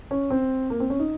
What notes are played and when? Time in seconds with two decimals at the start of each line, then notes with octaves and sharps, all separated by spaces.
0.11 C#4
0.30 C4
0.70 A#3
0.80 C4
0.90 C#4
0.99 D#4